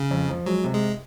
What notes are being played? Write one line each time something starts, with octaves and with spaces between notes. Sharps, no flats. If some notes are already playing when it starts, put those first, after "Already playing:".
Already playing: C#3
F2
F3
F#3 G#3
C3
G#3